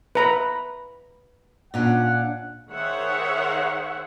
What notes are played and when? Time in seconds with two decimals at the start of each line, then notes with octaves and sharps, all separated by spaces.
0.15 B4 A#5 B5
1.74 A#2 C#4 D4 F#5
2.71 D#3 G#4 C5 C#5 E5 F#5